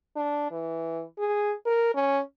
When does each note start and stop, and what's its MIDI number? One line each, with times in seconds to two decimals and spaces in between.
0.16 0.48 62
0.51 1.02 52
1.18 1.55 68
1.66 1.94 70
1.94 2.20 61